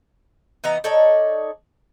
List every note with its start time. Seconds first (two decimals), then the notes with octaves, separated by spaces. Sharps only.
0.64 E3 B3 D#4 A#5
0.84 D#4 A4 C#5 D5